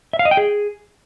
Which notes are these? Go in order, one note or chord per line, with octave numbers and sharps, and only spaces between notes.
E5
F5
D#5
G5
G#4